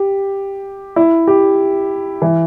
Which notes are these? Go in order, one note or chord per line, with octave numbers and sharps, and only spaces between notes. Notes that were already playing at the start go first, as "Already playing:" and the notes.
Already playing: G4
E4
G4
E3